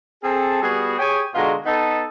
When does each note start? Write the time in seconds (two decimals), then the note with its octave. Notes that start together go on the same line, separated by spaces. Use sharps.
0.23 C4 G#4 A4
0.62 G3 B3 F#4 G#4
0.98 G4 G#4 C#5 G5 G#5
1.35 B2 D3 G#3 F4 F#4 A#5
1.65 B3 D#4 A4